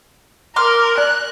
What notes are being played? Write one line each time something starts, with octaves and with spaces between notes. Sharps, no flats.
A#4 C6 D6 F6
D5 F#6